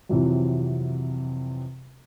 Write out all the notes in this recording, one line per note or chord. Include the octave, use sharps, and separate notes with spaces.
F2 C3 E3 F#3